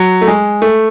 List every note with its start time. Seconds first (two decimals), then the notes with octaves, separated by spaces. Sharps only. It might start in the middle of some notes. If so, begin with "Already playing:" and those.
Already playing: F#3
0.22 A3
0.27 G#3
0.62 A3